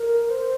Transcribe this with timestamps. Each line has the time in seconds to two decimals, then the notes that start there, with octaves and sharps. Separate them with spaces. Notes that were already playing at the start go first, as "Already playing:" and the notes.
Already playing: A#4
0.30 C5